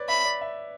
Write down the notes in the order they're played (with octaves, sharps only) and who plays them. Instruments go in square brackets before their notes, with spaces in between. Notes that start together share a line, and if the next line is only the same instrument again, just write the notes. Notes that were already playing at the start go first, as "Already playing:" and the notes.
Already playing: [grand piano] B4 C#5 D5
[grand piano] E5 [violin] B5
[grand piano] D5
E5